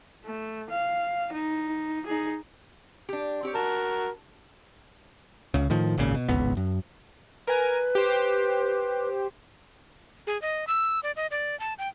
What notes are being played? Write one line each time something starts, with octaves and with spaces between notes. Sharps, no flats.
A3
F5
D#4
D#4 G#4
D4 G4
C4 G4 C#5
F#4 A#4 A5
C#2 C#3
A2 D#3 F3
G#1 C#2 A#2 C#3
B2
D1 G#1 C#2 B3
F#2
A#4 B4 G#5
G4 C5
G#4
D#5
E6
D5
D#5
D5
A5
G5